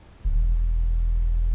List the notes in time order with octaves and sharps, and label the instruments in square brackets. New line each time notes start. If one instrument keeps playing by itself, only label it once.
[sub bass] E1